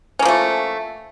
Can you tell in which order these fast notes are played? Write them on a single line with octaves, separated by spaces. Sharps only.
C#4 A#3 F3 A3